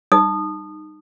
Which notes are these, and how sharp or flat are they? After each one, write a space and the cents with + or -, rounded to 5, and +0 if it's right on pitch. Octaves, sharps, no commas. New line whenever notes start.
D#4 -15 D#6 -25